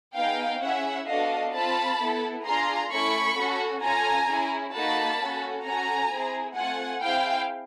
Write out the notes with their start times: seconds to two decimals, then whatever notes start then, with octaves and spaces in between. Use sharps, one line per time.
0.15 B3 D#4 G#4 F5 G5
0.60 C#4 E4 G#4 E5 F#5
1.06 B3 D4 F#4 A4 D#5 F5
1.52 C4 F4 A4 A5 B5
1.97 B3 E4 A4
2.44 D4 F4 G#4 A#5 C6
2.89 A3 C#4 E4 A4 B5 C#6
3.35 C#4 F#4 A4
3.80 C#4 F4 A4 G#5 A#5
4.26 C#4 E4 G#4
4.71 A#3 D#4 F#4 A4 A5 B5
5.17 C#4 F#4 A4
5.63 C#4 F#4 A4 G#5 A#5
6.09 C4 E4 G#4
6.55 A3 C4 F4 F#5 G#5
7.01 C4 E4 G#4 F5 G5